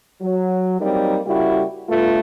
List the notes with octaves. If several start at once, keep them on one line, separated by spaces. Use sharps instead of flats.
F#3
F#3 G3 A#3 C4 D#4
C#3 G3 A#3 E4 F#4 G4
G2 A3 B3 F4